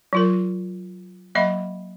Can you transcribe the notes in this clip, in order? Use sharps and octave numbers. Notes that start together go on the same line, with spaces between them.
F#3 F4 A#4
F#3 A#3 D#5 E5 B5